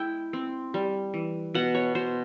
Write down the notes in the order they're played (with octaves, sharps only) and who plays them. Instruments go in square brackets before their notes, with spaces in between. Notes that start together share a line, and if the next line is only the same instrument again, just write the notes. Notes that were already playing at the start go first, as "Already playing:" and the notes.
Already playing: [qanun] G#3 E4 G5
C4
G3
E3
B2 F#5
C#5
B2 C5